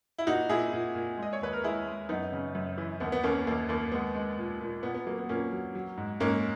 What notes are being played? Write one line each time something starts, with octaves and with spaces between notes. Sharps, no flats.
E4
A#2 D#4 F#4
A#2 E4 G#4
A#2
A#2
G#3 D#5
C#5
D#2 B4
A#4
G#3 E4 G#4
G#3
F#2 B3 D#4
C#3
F#2
E3
D#2 B3
B3
D#2 A#3 C#4
D#2 A#3
D#2 A#3
G#3 B3
G#3
A#2
A#2
A#2 B3
B3
F#3 A#3
B3
A#2 A#3 C#4
F#3
F#3
G#2
G#2 A#3 C#4